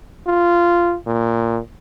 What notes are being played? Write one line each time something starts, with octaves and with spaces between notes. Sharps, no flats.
F4
A#2